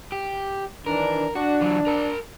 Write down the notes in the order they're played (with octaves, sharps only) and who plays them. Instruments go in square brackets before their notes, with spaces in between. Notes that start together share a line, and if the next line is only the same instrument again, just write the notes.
[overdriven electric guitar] G4
[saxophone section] D#3 E3 D4 [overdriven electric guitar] A#4
[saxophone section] D4 [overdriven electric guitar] F#4
[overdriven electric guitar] E3 F#3
A#4 A5